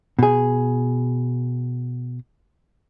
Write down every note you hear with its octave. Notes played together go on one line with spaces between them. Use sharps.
B2 G#4